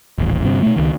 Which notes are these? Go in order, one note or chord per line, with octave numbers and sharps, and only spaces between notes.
D#1 A1
G1 G2 C3
B2 A3
C#2 D#3